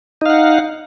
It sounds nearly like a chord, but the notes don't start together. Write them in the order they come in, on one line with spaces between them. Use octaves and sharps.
D#4 F5 F#5